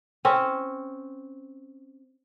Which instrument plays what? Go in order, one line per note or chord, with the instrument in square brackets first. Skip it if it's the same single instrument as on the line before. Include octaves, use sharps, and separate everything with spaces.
[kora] C4 C#4